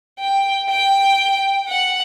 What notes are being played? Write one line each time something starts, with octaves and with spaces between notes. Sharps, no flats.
G5
G5
F#5